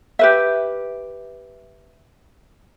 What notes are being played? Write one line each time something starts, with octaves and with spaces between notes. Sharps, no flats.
G4 B4 E5